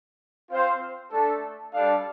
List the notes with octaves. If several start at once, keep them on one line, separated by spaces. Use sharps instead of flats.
C4 F4 C5 F5
A3 D4 A4
G3 D4 A4 D5 F5